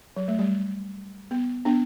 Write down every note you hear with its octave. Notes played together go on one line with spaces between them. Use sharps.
F#3
A3
G3
B3
B3 D4